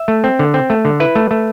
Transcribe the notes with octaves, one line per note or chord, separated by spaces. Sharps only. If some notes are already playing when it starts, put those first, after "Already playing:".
Already playing: E5
A3
C4
D3
C4
A3
D3
E4 B4
A3
A3